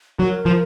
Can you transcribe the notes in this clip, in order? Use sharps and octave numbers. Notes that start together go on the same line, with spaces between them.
F#3 A#4
F3